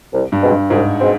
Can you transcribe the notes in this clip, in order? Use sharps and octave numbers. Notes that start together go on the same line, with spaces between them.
C2
G2
B2 G#3 C4
G2
C2 G#2
B2 G#3 C4